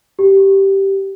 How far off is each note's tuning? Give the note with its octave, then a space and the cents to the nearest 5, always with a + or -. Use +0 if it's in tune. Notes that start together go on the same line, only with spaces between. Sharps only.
G4 -10